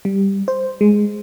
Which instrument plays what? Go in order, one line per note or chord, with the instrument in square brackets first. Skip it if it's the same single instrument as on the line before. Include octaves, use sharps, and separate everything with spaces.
[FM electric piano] G3
C5
G#3